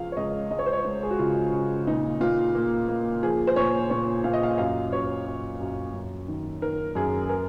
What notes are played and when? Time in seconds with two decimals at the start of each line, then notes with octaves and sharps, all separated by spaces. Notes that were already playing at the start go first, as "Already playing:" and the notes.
Already playing: C#2 F3 F5
0.12 C#5
0.17 C#2 D#5
0.51 G#3 D#5
0.59 C#5
0.66 C5
0.73 C#5
0.84 G#3
1.03 G#4
1.11 F#4
1.19 C#3 F4
1.52 C#3
1.87 A#2 D#4
2.21 A#2 F4
2.55 A#3
2.88 A#3
3.23 F3 G#4
3.47 C5
3.56 A#2 C#5
3.90 A#2 C#5
4.24 A#2 F5
4.33 D#5
4.43 F5
4.58 F#2 F5
4.92 F#2 C#5
5.26 F#2
5.60 F#2
5.93 F#2
6.28 D#3
6.62 D#3 A#4
6.95 F#2 G#4
7.29 A#4